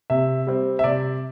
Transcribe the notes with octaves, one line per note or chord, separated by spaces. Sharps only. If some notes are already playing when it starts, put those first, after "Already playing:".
C3 E5
G3 C4
E5
C3 D5